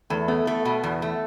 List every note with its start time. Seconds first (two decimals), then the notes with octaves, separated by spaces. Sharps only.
0.10 E2 A3
0.28 A3 B3
0.47 A3
0.65 B2
0.84 E2
1.02 A3